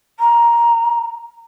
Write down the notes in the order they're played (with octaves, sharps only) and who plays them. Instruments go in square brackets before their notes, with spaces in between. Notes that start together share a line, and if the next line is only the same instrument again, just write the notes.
[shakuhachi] A#5